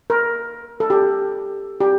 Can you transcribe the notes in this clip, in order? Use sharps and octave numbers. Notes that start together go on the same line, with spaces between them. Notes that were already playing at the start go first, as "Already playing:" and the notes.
A#4
A4
G4
G4